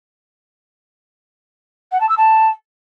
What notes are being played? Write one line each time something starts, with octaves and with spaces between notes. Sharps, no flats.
F#5
A5
E6
A5